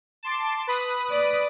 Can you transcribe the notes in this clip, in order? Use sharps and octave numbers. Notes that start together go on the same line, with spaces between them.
A5 C6 D6
B4 B5 D#6
D5